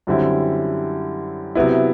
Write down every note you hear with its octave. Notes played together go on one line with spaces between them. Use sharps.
F#2 D3 G3 C4 E4
C3 F#3 B3 E4